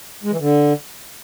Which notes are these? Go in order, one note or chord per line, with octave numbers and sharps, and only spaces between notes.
G#3
E3
D3